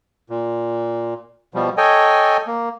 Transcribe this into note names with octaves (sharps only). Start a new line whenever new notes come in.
A#2
B2 F3 G3
A4 C#5 D#5 G5 G#5
A#3